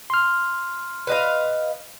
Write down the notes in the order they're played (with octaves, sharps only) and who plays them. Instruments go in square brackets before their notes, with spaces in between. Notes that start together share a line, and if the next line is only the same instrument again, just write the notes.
[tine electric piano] C6 F6
[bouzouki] B4 D#5 F5